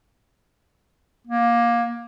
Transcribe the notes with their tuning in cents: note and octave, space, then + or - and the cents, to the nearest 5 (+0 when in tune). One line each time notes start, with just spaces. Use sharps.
A#3 +20